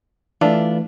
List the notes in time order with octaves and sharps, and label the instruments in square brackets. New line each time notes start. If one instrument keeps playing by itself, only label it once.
[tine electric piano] E3 A3 [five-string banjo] D4 E4 F4